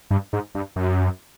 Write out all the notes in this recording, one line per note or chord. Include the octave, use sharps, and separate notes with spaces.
G2
G#2
G2
F#2